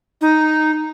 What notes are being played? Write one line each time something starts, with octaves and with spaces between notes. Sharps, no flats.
D#4